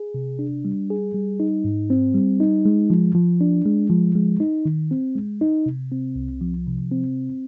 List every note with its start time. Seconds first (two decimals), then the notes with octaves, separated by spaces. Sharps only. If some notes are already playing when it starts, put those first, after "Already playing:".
Already playing: G#4
0.14 C3
0.39 D4
0.65 G3
0.90 G#4
1.14 G3
1.40 D#4
1.64 G#2
1.90 C4
2.15 G3
2.40 D#4
2.65 G#3
2.90 F3
3.15 F3
3.41 D4
3.66 G#3
3.90 F3
4.15 G#3
4.40 D#4
4.65 D#3
4.91 C4
5.15 G#3
5.41 D#4
5.66 C3
5.92 C4
6.16 C2
6.41 F3
6.67 C3
6.91 C4